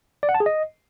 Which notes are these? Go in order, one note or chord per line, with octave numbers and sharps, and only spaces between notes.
D5
F#5
A5
G#4
D#5